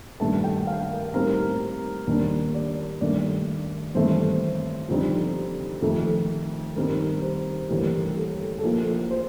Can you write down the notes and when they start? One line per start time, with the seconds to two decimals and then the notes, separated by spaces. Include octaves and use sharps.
0.20 G2 D#3 A3 D4 A5
0.44 G5
0.67 F5
0.91 A#4
1.14 A2 G3 C4 D#4 A#4
2.07 D#2 D#3 G3 D4 A#4
2.54 D5
3.01 G2 D#3 A3 D4 D5
3.94 A1 G2 D#3 A3 C4 C5
4.89 F2 D3 G3 C4 D#4
5.82 F2 D#3 A3 D#4 A4
6.76 G2 D#3 G3 C4 D#4 A#4
7.22 C5
7.69 A1 G2 D3 G3 A#3 A#4
8.17 A4
8.58 A4
8.63 A#1 A#2 F3 A#3 A#4
9.11 C5